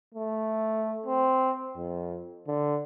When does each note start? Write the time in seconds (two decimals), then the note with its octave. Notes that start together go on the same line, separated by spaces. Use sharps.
0.14 A3
1.06 C4
1.77 F2
2.47 D3